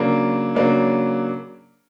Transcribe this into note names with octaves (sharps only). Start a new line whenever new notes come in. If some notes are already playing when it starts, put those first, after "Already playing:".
Already playing: C#3 F#3 A#3 D4
C#3 F#3 A#3 D4